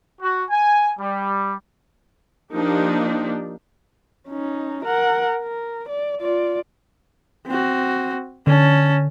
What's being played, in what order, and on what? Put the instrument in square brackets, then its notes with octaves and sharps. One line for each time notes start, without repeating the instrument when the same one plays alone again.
[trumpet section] F#4
G#5
G3
[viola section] F3 A#3 D4 D#4 G4
[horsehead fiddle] C#4 D#4
A#4 F#5
A#4
D5
F4 D5
C4 F#4
[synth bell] D3 [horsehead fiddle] C#4 A5